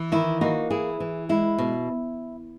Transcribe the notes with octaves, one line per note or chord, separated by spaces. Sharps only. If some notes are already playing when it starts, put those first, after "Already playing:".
Already playing: E3
D#3 E4
A#3 D#4 F#4
E3 E4 G#4
E3
G#3 E4
B2